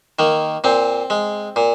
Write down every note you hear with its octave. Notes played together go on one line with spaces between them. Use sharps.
D#3 A#3
A#2 C4
G#3
A#2